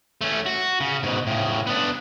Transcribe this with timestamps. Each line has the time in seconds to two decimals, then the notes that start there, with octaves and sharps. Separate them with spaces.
0.21 A3 C#4
0.46 F#4
0.80 C#3
1.03 G#2 B2
1.27 A2 C#3
1.67 B3 D4